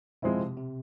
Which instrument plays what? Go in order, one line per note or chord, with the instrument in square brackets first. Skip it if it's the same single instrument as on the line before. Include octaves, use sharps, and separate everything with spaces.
[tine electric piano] B2 [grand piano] F3 G#3 C4 E4
[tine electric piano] C3
C3